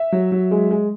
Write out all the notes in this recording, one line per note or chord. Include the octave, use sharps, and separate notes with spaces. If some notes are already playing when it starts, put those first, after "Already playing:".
Already playing: E5
F#3
F#3
G#3
G#3